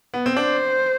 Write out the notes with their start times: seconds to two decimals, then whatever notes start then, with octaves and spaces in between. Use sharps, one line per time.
0.14 B3
0.26 C4
0.36 D4 C5